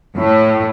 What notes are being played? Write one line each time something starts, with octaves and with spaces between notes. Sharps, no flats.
A2